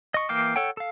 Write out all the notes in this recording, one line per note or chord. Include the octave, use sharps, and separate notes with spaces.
D#5 C#6
E3 A#3 F5 G5 D6
A4 C#5 F#5 G5
A4 F5